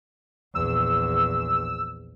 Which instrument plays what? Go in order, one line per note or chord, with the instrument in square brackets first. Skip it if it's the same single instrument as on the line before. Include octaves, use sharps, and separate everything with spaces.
[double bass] A#1 E2 [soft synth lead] E6